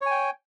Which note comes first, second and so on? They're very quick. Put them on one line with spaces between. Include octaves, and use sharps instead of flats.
C#5 G#5 G5